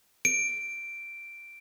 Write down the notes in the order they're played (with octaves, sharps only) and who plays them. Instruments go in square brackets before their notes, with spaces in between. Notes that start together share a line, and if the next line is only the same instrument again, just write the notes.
[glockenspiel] D7